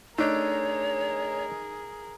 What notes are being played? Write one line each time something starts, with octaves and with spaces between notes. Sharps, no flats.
A3 D4 D#4 G#4 A#4 C#5